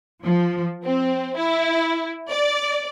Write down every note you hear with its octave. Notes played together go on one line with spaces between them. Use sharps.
F3
C4
E4
D5